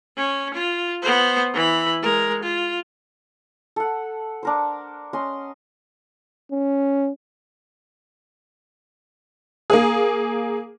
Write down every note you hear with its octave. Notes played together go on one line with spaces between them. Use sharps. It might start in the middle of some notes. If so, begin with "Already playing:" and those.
C#4
F4
B3 C5
E3 B5
G#3 A#4
F4
A4 F#5
D4 A#4 C5
C#4 D#5 C6
C#4
A#3 G#4